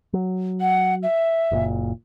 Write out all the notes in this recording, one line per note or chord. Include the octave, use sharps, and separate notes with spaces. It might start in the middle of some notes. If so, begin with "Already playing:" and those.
F#3
F#5
E5
F#1 A#2